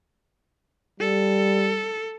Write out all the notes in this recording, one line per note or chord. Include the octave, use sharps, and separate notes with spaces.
G3 A4